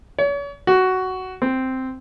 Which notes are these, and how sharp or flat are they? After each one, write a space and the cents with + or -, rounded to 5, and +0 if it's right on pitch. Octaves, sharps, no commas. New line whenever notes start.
C#5 +40
F#4 +10
C4 -5